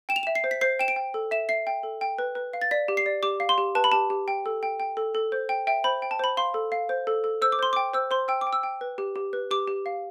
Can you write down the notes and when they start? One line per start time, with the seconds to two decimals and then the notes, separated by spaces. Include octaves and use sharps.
0.09 G5 E7
0.16 F7
0.23 E5 E7
0.35 C7
0.44 C5
0.51 B6
0.61 C5 C7
0.79 G5 E7
0.88 D7
0.96 G5
1.14 A4
1.31 E5 E7
1.49 E5 C7
1.67 G5
1.83 A4
2.01 G5
2.19 B4
2.35 B4
2.53 F5
2.62 A6
2.71 D5 B6
2.88 G4
2.97 C7
3.06 D5
3.23 G4 D6
3.40 F5
3.49 C6
3.58 G4
3.75 B4 A5
3.84 B5
3.92 G4 A5
4.10 G4
4.28 G5
4.46 A4
4.63 G5
4.80 G5
4.97 A4
5.15 A4
5.32 C5
5.49 G5
5.67 E5 G5
5.84 C5 B5
6.02 G5
6.11 A5
6.19 C5 B5
6.37 F5 C6
6.54 A4
6.72 F5
6.89 C5
7.07 A4
7.24 A4
7.42 C5 E6
7.52 D6
7.59 C5 C6
7.73 G5 D6
7.94 C5 E6
8.11 C5 C6
8.28 G5 E6
8.41 D6
8.47 G5
8.53 E6
8.63 G5
8.81 B4
8.98 G4
9.16 G4
9.33 B4
9.51 G4 D6
9.67 G4
9.86 F5